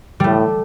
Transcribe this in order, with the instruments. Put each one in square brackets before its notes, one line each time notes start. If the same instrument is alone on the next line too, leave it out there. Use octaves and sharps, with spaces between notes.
[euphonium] A2 [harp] G3 A3